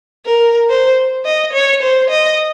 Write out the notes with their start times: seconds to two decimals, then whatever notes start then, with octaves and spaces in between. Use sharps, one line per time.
0.26 A#4
0.70 C5
1.25 D#5
1.53 C#5
1.83 C5
2.10 D#5